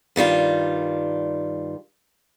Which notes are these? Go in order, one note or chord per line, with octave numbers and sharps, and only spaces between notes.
G2 D#3 G3 F4